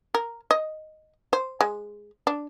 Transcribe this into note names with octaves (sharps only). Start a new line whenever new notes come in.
A#4
D#5
C5
G#3
D4